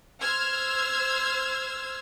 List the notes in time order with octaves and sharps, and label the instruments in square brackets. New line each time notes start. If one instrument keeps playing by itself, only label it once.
[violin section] C5 E6 F6 G#6